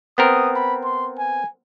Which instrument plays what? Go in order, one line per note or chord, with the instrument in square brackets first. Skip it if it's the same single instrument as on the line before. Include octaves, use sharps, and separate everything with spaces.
[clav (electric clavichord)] B3 C4 A#4 [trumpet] D#6
[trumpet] B5
C6
G#5